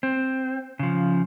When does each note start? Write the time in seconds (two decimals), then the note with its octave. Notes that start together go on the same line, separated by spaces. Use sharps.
0.03 C4
0.79 C#3 F3